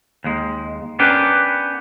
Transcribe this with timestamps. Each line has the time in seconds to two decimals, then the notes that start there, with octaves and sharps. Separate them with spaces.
0.24 D#2 G#3
0.99 B3 C#4 D4 G4 A#4 B4